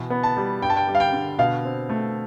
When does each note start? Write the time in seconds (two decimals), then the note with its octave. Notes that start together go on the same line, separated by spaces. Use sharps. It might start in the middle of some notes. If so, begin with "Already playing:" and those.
Already playing: B2 E3
0.10 B3
0.23 A5
0.37 G3
0.62 G2 G5
0.70 A5
0.77 G5
0.88 G3
0.95 F5
1.00 G5
1.12 D3
1.39 B2 F5
1.64 C4
1.89 A3